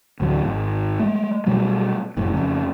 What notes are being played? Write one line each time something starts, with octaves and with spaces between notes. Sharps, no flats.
A1 D2 D3 F#3
G#1
G#3 A3
B2 F#3 G3 A3
F1 F#2 A2
F2 C#3